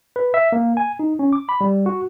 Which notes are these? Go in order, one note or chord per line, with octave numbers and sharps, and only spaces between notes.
B4
E5
A#3
G#5
D#4
C#4
D6
B5
G3
F#4